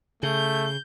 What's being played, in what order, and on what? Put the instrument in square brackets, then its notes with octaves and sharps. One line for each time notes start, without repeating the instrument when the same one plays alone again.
[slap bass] C#3 [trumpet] A3 [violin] G6